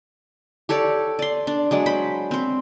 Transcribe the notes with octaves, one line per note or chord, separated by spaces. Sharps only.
G4 A4 C#5 D5
D5 C6
D4
F#3 G#3 D5
C5 B5
C4 C5